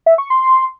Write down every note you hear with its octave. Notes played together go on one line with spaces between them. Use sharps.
E5
C#6
C6